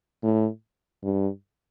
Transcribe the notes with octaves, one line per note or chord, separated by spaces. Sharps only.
A2
G2